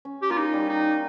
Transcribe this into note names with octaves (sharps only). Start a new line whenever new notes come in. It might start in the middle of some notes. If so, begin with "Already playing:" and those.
C#4
G4
A#3 F4
D#4
G3
D#4